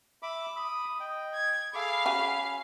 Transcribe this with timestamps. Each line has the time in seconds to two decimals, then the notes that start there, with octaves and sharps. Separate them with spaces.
0.23 E5 B5 D6
0.56 B5 D#6
1.00 D#5 G5
1.34 G#6
1.74 G#4 A4 F5 B5 D6
2.06 C#4 F#4 G#4